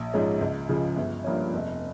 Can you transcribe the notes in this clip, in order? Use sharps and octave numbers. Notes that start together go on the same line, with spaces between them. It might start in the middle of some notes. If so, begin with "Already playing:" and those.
Already playing: A#1
G#2 F3 G#3 C#4
C#2
C#3 F3 G#3
G1
G2 F3 A#3 C#4
F1